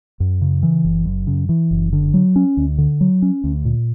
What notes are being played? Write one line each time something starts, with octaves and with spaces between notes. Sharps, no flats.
F#2
C#3
E3
F#1
F#2
C#3
E3
F#1
D3
F#3
C#4
D2
D3
F#3
C#4
D2
A#2